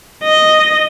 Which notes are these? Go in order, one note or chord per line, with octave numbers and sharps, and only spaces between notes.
D#5